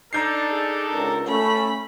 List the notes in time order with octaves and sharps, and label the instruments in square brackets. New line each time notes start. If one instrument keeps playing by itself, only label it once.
[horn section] D4 D#4 A4 [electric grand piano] A#5 G6 C7
[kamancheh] G#4
[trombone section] C#2 [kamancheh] A#4
[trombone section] A3 C#4 [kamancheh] B5